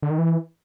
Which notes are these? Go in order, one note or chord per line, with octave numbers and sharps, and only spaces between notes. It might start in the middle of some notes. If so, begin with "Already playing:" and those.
D3
D#3
E3